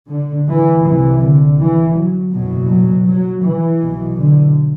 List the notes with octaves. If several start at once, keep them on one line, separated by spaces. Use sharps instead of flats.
D3
E3
C2 C3 E3
D3
E3
F#3
F#1 E2 B2 F#3
F#3
F#3
E3
B1 B2
D3